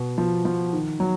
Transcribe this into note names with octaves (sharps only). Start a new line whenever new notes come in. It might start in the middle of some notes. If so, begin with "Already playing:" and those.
Already playing: B2
F3
F3
D#3
F#3